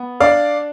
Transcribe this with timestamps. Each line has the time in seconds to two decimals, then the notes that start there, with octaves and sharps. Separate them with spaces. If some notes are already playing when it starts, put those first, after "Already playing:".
Already playing: B3
0.20 D4 D5 F5